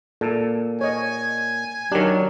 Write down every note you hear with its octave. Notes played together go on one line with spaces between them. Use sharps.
A#2 A4
C#5 D#5 G#5
D#3 F#3 D4 G4 A#4